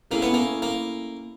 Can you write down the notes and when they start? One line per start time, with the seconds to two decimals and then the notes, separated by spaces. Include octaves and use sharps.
0.11 A3 A#3 C#4 E4 G#4
0.22 B3
0.34 A#3
0.62 A#3